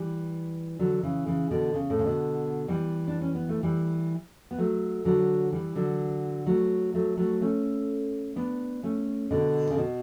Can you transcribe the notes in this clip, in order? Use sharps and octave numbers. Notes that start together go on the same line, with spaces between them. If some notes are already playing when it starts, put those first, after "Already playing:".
Already playing: E3 G3
D3 F#3
C#3 E3
C#3 E3
B2 D3
C#3
A2
C#3
B2 D3
E3 G3
D4
C#4
B3
A3
E3 G3
B3
F#3 A3
D3 F#3
E3 G3
D3 F#3
F#3 A3
F#3 A3
F#3 A3
A3 C#4
B3 D4
A3 C#4
B2 D3
C#3
B2